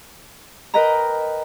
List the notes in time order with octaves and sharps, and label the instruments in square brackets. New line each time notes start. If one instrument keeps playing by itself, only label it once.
[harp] A#4 B4 D#5 G5 A#5